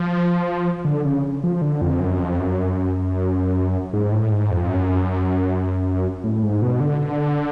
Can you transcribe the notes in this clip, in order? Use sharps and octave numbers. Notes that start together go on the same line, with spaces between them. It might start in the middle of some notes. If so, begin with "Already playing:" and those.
Already playing: F3
D3
C#3
F3
D3
F2
F#2
F2
F#2
G#2
A2
G#2
F2
F#2
A2
G#2
B2
D3